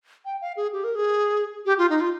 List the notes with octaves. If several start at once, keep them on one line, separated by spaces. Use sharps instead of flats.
G5
F5
G#4
G4
A#4
G#4
G4
F4
D#4
F4